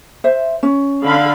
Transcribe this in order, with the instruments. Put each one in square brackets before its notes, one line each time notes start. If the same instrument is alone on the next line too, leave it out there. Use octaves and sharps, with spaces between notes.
[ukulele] C5 E5
C#4
[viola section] D3 F5 B5